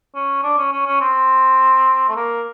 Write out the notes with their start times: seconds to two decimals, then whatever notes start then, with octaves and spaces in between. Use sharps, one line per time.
0.15 C#4
0.43 D4
0.58 C#4
0.72 C#4
0.87 C#4
1.01 C4
2.09 A3
2.16 A#3